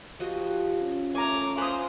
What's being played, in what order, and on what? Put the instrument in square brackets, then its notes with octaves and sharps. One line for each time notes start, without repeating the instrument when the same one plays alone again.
[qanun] F3 F#4 D#5 [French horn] G4
[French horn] C#4
[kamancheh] A3 D6 [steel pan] C#5 A#5 [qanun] G#5
[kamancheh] F4 C5 [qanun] B4 F#5 A#5 [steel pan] G#5 D#6